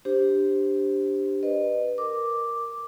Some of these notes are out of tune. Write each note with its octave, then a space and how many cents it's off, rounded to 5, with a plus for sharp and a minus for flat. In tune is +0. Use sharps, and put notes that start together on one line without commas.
D4 +0 G4 +0 C5 +0
B4 +0 D#5 -30
A#4 +0 D6 +0